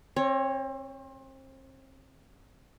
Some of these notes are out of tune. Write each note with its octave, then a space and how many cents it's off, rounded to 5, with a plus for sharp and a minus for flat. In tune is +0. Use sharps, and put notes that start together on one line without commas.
C4 +35 C#5 +0